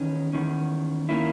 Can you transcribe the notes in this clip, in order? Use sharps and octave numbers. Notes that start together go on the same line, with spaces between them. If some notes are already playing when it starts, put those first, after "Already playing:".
Already playing: E2 D#3 C#4
E2 D#3 C#4
D#3 A#3 C#4 E4